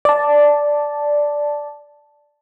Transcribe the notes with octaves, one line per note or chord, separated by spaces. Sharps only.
D5 A5